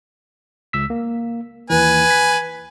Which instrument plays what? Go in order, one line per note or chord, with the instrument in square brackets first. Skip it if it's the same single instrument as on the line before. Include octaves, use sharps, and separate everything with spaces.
[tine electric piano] C#2 E6 B6
A#3
[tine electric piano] D#2 E3 [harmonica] B4 G#5
[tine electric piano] B6